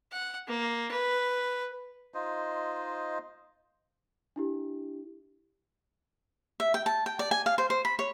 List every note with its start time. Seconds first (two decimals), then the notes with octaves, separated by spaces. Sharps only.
0.12 F#5
0.48 A#3
0.92 B4
2.14 D#4 F4 C5 D#5
4.36 D4 E4 G4
6.60 E5
6.74 G5
6.86 A5
7.06 G5
7.19 D5
7.31 G#5
7.46 F5
7.58 C5
7.70 C5
7.85 B5
7.99 C#5